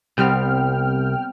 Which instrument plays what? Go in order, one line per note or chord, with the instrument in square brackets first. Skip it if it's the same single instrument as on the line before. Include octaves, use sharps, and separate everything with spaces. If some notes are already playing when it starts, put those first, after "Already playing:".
[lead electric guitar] C2 [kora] G3 B3 C4 [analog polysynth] G5 F6